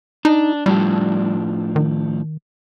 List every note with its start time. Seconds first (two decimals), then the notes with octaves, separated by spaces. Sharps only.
0.25 D4 D#4
0.66 A2 F3 G3 D4
1.76 D#3